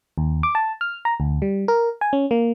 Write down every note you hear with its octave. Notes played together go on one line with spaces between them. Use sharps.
D#2
D6
A5
F6
A#5
D2
G3
A#4
G#5
C#4
A#3